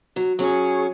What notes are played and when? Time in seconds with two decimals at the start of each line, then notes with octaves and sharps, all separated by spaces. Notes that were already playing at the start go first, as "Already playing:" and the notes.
0.16 F#3
0.39 F#3 C#4 G#4 C#6